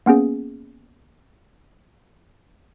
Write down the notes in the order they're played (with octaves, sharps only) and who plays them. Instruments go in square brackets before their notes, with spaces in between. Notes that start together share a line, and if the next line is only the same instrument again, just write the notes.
[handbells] A#3 B3 C#4 G#4